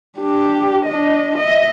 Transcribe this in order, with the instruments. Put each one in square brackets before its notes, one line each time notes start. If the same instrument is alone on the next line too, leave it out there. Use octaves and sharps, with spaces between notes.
[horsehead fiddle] D4 G4
D4 D#5
D#5 E5